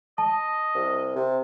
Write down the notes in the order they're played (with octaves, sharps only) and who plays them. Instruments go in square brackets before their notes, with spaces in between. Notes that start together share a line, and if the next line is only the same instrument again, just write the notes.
[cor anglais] D#5 [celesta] A5
[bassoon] C2
C3